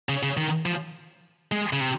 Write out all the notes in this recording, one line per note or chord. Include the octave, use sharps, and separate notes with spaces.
C#3
C#3
D#3
F3
G#3
C#3
C3